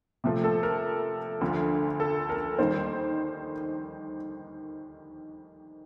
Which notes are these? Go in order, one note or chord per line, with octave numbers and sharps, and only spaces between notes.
C3 F3 A3
A4
A#4
D2 D3 F3
A4
A#4
D#2 D#3 G3 C5